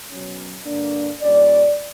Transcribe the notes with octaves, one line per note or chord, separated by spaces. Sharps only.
B2 F#3 C#4
G2 D3 A#3 D4
A#2 G3 C#4 D5